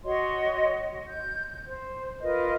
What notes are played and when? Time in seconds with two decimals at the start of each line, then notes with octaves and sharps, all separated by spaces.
0.04 F#4 C#5 D#5 C6
1.07 G6
1.66 C5
2.21 F4 A#4 B4 D#5